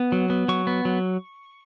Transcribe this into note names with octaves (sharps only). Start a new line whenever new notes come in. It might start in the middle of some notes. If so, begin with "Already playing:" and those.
Already playing: B3
F#3
B3
F#3 C#6
B3
F#3